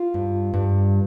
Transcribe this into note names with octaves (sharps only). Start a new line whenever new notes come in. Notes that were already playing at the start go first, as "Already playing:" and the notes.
Already playing: F4
G2
G2